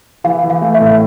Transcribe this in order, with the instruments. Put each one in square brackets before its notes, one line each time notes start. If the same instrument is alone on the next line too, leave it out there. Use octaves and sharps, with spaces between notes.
[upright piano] E3 [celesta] F5
[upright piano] E3
[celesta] F5
[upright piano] A3
[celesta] E5
[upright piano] A2